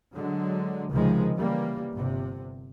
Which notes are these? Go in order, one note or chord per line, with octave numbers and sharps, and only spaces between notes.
D3 F#3 G#3
C#2 C3 D#3 F3 G#3
C#3 E3 G3 A#3
G1 C3